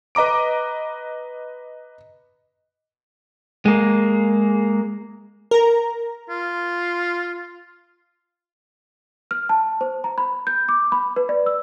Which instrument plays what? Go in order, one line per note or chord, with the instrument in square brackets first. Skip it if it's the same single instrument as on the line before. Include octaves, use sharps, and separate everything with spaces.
[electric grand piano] B4 D#5 A#5 D6 D7
[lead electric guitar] G#3 A#3
[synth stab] A#4 A#5
[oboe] F4
[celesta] F6
A5
C5
A#5
B5
G6
D6
B5
B4
D5
E6